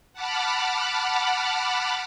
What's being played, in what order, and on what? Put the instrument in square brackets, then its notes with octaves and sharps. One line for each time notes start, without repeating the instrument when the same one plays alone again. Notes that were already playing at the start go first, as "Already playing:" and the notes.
[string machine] F#5 A5 B5 D6 F6